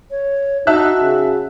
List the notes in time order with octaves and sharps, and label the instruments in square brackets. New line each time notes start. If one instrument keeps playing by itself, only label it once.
[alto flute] C#5
[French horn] D#4 [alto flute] F#4 [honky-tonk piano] E5 A5 F#6
[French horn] C#3